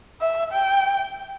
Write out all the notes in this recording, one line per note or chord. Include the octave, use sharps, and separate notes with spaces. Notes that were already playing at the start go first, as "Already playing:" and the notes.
E5
G5